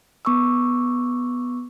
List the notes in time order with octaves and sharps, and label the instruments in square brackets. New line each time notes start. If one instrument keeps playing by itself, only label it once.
[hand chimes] B3 C#6 D6 E6